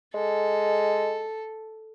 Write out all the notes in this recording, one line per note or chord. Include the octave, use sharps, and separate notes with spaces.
G#3 A4